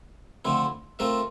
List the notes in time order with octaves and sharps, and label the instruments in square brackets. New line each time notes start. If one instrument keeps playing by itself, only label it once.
[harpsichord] D3 F3 A3 C4 E4
A3 C4 F4 A#4 E5